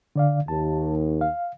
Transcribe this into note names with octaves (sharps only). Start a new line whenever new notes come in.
D3 D5 F5
D#2 A5
F5